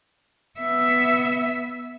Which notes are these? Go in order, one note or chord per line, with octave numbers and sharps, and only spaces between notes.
B3 E5